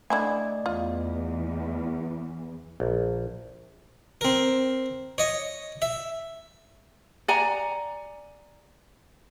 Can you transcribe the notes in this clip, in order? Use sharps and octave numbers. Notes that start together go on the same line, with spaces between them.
D3 A3 E4 D5 D#5 G#5
E2 F4
A#1
C4 A#4
C#5 D#5 C#6
E5
D5 F#5 G#5 A#5